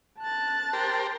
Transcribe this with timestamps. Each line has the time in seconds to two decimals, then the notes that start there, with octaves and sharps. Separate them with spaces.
0.20 A5 F#6 A6
0.73 G4 A#4 C5